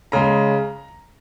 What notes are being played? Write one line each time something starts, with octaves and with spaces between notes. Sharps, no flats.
C#3 G#3 A#5